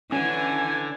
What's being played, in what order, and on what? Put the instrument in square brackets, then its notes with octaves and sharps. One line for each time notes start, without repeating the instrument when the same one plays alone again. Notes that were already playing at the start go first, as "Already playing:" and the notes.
[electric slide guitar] D3 [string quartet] E3 [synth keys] C#4 [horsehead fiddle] G#5